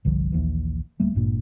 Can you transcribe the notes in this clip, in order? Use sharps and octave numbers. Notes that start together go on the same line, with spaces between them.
G1 C2 D3 F3
A#1 D#2 E3
D1 G3 A3 A#3
G#1 G2 A#2 A#3